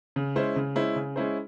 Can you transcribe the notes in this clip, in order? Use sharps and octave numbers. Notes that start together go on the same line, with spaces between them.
C#3
G#3 C#4 E4 C5
C#3
G#3 C#4 E4 C5
C#3
G#3 C#4 E4 C5